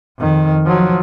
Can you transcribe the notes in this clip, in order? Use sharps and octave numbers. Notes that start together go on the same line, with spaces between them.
F2 D#3
F3 F#3